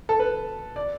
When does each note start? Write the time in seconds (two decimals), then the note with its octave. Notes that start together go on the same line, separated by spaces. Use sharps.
0.09 A4
0.20 B4
0.76 D5